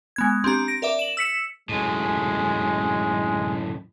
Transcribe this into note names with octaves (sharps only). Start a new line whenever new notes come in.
G#3 B3 G#6
C4 D4 G4 A#5
A#6 D7
A#4 D5 E5 D6
E7 F#7
E6 B6 C#7 E7
F#2 A2 G#3